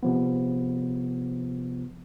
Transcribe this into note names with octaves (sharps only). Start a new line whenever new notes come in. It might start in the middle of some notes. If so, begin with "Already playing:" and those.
C3 F3 B3